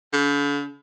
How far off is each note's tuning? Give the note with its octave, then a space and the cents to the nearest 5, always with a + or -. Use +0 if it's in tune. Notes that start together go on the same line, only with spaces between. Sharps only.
D3 -45